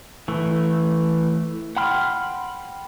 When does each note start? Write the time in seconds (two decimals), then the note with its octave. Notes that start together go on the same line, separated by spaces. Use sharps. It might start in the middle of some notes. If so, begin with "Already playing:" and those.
0.28 E3 A3
1.77 F#5 G5 B5 C6 F6